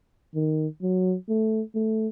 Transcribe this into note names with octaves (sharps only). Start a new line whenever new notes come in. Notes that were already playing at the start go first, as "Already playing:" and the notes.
D#3
F#3
A3
A3